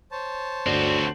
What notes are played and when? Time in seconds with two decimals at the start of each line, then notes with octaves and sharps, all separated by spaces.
0.11 C5 C#5 A5
0.66 G1 D2 C4 F#4 D5